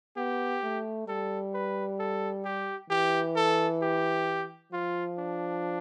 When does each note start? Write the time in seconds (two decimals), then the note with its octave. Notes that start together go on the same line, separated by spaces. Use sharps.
0.17 B3 G4
0.63 A3
1.07 G3 A4
1.54 B4
1.99 A4
2.45 G4
2.90 E3 G4
3.36 A4
3.82 G4
4.72 F3 F4
5.18 D4